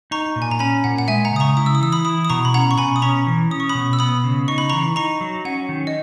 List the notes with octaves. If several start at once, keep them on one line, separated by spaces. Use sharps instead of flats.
D#4 A#5 C#6
A#2
G#5
A#5
C#4 G#5 B5
A#2 F#5
F#5
G#3 E5 G#5
F#5 A#5
C#3 D#6
A#5 C#6
E4 D#6
E6
D#6
E3 E6
B5 D#6
E4 B5 D#6
D#6
B2 A#5 C#6
B5
C#4 F#5 A#5
C#6
B2 G#5 B5
D#6
C#4 A#5 C#6
E3
C#4 D#6
C#6
B5 D#6
B2
E6
B3 B5 D#6
C#3
D#4 C#6
B5
E3 A#5 C#6
D#4 A#5 C#6
F#3
C#4 F#5
D#3
D#5